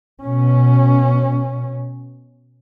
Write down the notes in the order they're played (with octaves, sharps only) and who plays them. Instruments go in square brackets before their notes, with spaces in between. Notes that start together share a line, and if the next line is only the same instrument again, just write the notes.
[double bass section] B2 C#4